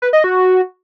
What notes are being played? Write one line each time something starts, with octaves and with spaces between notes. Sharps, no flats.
B4
D#5
F#4